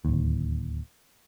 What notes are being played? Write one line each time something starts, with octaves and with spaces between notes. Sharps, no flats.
D1 D#2